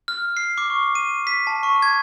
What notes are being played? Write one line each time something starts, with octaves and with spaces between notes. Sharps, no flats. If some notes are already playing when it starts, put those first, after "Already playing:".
F6
C7
D6
C#6
D#7
B6
A5
C#6
G#6